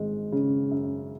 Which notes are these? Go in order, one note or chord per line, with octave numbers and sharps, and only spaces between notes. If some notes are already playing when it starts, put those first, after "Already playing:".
Already playing: G#1 G#3
C#3
F#2